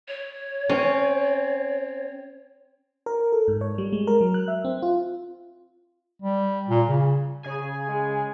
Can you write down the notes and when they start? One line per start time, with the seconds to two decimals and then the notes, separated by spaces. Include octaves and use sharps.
0.08 C#5
0.69 C4 C#4
3.06 A#4
3.32 A4
3.48 G#2
3.61 C#5
3.78 G3
3.93 G#3
4.07 A#4
4.21 F#3
4.34 F#6
4.48 E5
4.65 C4
4.82 F4
6.22 G3
6.69 A#2
6.88 C#3
7.43 C#3 G#4 G#5
7.87 G#3